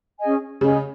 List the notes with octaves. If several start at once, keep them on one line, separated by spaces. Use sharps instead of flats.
C#4 G#4 D#5 G#5
C#3 C#4 G#4 D#5 G#5